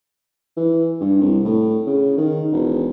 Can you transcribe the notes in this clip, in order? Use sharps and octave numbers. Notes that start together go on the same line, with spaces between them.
E3
G2
C2
A2
C#3
D#3
E1